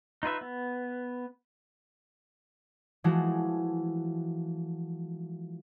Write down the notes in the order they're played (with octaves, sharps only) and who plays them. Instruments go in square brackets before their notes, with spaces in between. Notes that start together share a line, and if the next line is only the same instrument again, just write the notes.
[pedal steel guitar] D#4 F4 B4 E5
B3
[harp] E3 F3 G#3 A3 F#4